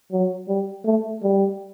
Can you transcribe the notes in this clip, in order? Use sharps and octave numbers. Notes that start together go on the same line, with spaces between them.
F#3
G3
A3
G3